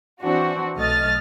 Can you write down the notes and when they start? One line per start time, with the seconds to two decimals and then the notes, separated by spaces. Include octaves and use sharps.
0.22 E3 C4 D4 F#4
0.77 B1 A3 D#5 F6 A6